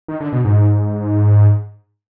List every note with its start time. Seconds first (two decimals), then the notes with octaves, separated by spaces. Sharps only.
0.08 D#3
0.20 D3
0.33 B2
0.45 G#2